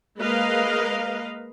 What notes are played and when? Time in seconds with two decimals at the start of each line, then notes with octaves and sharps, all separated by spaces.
0.20 G#3 A#3 A#4 B4 D#5 F5